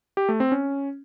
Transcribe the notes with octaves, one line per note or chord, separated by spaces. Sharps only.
G4
A3
C4
C#4